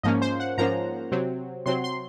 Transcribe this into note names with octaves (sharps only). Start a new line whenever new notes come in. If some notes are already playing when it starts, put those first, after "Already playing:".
G#2 F3 A#3 C#4 D#5
C5
F#5
G#2 F3 A#3 C#4 A#5
C3 F#3 C4
C3 F#3 C4 C6
C6